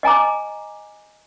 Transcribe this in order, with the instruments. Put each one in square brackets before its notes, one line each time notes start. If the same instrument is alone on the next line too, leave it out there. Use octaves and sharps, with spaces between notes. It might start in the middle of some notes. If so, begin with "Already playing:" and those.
[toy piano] D#5 G#5 A#5 D6